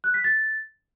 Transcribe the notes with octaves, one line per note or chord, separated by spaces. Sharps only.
F#6
B6
A6